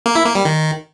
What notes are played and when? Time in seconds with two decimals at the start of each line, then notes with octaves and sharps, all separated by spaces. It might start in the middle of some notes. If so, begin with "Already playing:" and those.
0.06 A#3
0.16 E4
0.25 A#3
0.35 G3
0.45 D#3